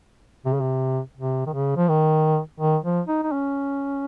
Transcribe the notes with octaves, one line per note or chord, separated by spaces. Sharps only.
C3
C#3
C3
C3
D#3
C#3
F3
D#3
D#3
F3
D#4
D#4
C#4